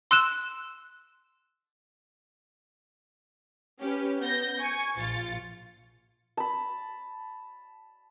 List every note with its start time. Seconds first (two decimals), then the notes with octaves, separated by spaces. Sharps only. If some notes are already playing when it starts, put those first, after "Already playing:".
0.11 C6 E6 F#6 E7
3.80 C#4 G4 B4
4.19 B3 G6 A#6
4.59 G#5 C#6 G#6
4.97 A#1 F4 A6 C#7
6.37 A5 B5